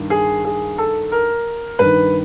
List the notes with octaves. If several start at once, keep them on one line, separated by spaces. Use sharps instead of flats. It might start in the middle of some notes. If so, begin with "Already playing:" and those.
Already playing: G2 D#3
G#4
G#4
A4
A#4
G2 D#3 B4